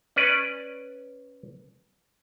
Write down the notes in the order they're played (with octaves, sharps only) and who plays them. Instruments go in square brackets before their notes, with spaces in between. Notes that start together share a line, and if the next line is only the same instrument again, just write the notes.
[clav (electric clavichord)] C#4 B4 D5